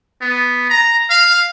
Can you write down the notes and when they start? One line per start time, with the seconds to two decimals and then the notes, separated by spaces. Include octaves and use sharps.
0.21 B3
0.70 A#5
1.10 F5